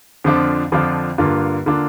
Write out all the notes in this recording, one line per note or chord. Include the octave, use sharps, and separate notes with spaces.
F2 D3 F3 D4 F4
F2 D3 F3 D4 F4
G2 D3 A#3 D4 F4
D3 A#3 D4 F4